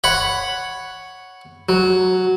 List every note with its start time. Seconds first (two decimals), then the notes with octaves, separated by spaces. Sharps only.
0.04 C#5 F#5 B5
1.69 F#3